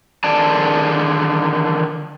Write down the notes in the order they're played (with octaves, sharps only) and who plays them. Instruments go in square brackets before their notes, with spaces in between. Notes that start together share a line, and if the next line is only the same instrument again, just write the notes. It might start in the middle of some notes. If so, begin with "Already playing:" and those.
[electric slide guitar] D3 D#3 G#4 D5 A5